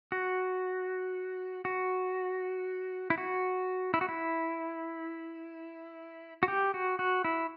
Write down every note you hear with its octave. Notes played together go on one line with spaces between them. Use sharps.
F#4
F#4
E4
F#4
E4
F#4
E4
F#4
G4
F#4
F#4
E4